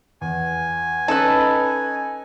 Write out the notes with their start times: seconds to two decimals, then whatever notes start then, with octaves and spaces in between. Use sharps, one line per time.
0.21 E2 G#5
1.08 C#4 D#4 A4 B4 D#5